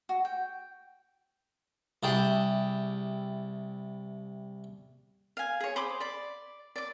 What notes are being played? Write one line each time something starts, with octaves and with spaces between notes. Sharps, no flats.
F#4
G5
C2 E4 G4 G#4 G5 A5
F5 G#5
G#4 C#5
C5 B5 D6 D#6
D5 B5
D5 D6